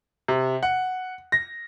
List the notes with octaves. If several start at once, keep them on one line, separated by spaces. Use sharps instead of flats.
C3
F#5
A#6